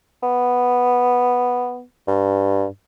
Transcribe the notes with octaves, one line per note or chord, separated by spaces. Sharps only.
B3
G2